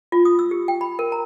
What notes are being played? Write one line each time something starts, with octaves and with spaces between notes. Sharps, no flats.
F4
D#6
E6
G4
G5
B5
A#4
A#5